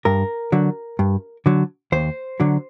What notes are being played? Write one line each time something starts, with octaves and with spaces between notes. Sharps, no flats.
G2 A#4
D3 F#3
G2
D3 F#3
D#2 C5
D3 F#3